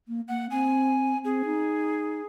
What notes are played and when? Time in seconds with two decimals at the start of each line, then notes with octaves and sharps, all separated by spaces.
0.08 A#3
0.29 A#3 F#5
0.51 C4 G#5
1.25 C4 G#4
1.45 D#4